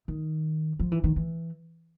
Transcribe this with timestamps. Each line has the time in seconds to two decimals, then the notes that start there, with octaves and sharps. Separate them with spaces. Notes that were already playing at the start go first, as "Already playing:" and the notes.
0.08 D#3
0.79 F3
0.92 E3
1.04 D#3
1.16 E3